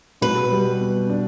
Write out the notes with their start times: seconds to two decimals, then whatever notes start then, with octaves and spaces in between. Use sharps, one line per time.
0.21 B2 B4
0.51 G3
0.80 B3
1.10 D4